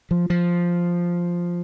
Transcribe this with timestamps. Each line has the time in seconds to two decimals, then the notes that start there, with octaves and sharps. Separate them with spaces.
0.11 F3
0.30 F3